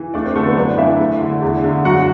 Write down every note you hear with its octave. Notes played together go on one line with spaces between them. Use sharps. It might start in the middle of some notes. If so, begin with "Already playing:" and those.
Already playing: E3
A3 D4 D5
C4 C5
D3 A3 A4
B3 B4
F#2 D4 D5
E3 E4 E5
A3
D3
E2
D3
F#2 F#4 F#5